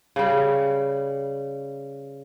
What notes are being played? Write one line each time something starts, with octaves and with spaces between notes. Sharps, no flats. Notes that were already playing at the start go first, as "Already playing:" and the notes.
C#3 G3